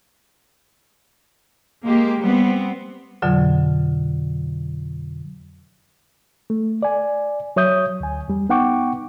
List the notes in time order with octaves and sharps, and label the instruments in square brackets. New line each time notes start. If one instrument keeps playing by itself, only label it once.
[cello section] G#3 A#3 G4
G3 B3 C4
[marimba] F2 B2 D3 F#3 F4
[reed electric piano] A3
D5 G#5
F#3 C#5 E5 D#6 G6
D2 G#5
E2 G3
B3 D#4 F#5 G5 C#6 D6